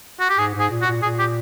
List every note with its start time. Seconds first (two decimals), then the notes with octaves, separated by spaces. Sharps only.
0.20 F#4
0.29 G4
0.38 G#2 G#4
0.55 G#2 G#4
0.71 A#2
0.82 F#4
0.87 A#2
1.02 A#2 G#4
1.19 G4